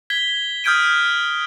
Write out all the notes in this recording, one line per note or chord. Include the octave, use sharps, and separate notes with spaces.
G#6 B6 G7
D#6 F6 G6 G#6 D7 D#7